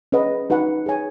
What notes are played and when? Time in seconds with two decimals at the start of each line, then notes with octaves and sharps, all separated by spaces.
0.12 C#4 G#4 B4 D#5 F#5
0.50 D#4 F#4 B4 F#5 A5
0.86 G#4 C#5 G#5